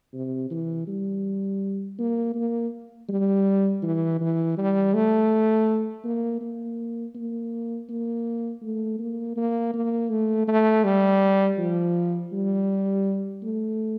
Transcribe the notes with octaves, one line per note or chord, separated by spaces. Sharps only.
C3
E3
G3
A#3
A#3
G3
E3
E3
G3
A3
A#3
A#3
A#3
A#3
A3
A#3
A#3
A#3
A3
A3
G3
F3
G3
A3